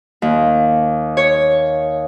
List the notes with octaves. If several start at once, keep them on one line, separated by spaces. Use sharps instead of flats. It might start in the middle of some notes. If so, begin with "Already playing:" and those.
D#2
C#5